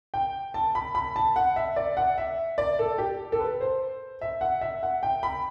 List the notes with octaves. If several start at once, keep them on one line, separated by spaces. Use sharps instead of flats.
G5
A5
B5
B5
A5
F#5
E5
D5
F#5
E5
D5
A4
G4
A4
B4
C5
E5
F#5
E5
F#5
G5
B5